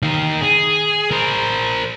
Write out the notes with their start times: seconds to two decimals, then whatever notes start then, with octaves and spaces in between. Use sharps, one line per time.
0.03 D#3 F5
0.41 G#4
1.11 A#4 C5